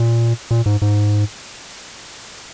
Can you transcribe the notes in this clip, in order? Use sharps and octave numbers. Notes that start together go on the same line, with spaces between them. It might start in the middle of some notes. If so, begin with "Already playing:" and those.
Already playing: A#2
A#2
G#2
G#2